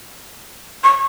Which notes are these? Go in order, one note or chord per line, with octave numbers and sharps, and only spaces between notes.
C#6